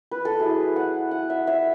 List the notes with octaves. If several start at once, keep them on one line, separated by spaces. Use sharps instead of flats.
B4
A4
F#3 A3 E4 G#4
F#5
F#5
E5
E5